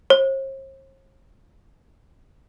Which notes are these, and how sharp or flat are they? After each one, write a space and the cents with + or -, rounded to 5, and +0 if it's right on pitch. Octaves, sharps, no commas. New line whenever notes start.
C5 +45